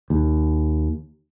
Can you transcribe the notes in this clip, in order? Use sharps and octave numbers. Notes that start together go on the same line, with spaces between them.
D#2